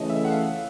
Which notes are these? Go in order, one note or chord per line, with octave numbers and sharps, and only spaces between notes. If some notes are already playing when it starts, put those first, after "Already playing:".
Already playing: C#3 E3 A3 D#5
E5
F#5
F5